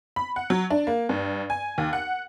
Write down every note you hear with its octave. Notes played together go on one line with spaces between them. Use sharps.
B5
F#5
F#3
D4
A#3
G2
G#5
D#2
F#5